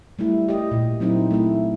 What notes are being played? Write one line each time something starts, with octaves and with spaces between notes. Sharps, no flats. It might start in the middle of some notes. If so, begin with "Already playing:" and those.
G3 A3 E4
G4 D#5
A#2
F#3 C4 D#4 E4
A3 E4